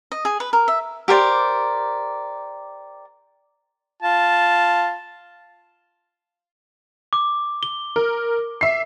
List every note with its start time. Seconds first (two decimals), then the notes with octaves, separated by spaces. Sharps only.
0.12 D#5
0.25 G#4
0.40 B4
0.53 A#4
0.68 E5
1.08 G4 A#4 C5 D5
4.03 F4 A5
7.13 D6
7.63 G7
7.96 A#4
8.61 E5 C7